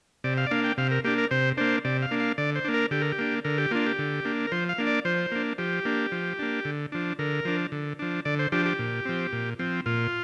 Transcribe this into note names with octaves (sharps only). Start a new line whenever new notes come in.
C3 D5
F5
D5
A#3 D4 F5
G5
C3 F5
A#4
A#3 D4 G4
A#4
C3 C5
A#3 D4 C5
C3 D5
F5
A#3 D4
F5
D3 D5
C5
A#3 D4
A#4
D3 G4
A#4
G4
A#3 D4
D3 A#4
G4
A#3 D4 F4
G4
D3
A#3 D4
A#4
F3 C5
F5
A#3 D4
D5
F3 C5
A#3 D4
F3 G4
A#3 D4
F3
A#3 D4
D3
F3 D4
D3 A#4
F3 D4
D3
F3 D4
D3 D5
C5
F3 D4 G4
G4
A#2
F3 C4
A#2
F3 C4
A#2 F4